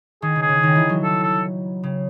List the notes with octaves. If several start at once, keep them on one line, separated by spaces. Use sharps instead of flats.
D#3 G#4
C#3
G#4
C#3
D#3
E3
F#3
A4
A4
C#3